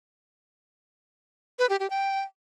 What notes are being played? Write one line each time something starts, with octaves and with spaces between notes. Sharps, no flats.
B4
G4
G4
G5